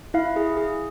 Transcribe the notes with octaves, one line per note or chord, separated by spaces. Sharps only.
E4 F5
G#4
G#4